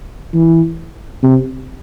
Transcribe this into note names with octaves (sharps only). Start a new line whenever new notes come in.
E3
C3